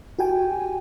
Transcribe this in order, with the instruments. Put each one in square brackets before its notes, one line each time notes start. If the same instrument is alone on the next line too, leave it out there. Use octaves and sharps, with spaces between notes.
[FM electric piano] F#4 G4 G5 G#5